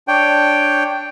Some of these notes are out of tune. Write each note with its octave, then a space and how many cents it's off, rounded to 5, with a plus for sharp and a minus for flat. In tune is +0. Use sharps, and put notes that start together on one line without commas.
D4 +0 C#5 +0 G5 +0